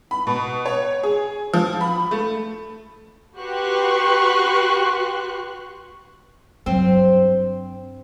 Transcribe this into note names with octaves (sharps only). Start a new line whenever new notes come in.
B5
B2
C#5
G#4
F3
B5
A3
F#4 G4 B4 C6 C#6 F#6
G2 F#3 C4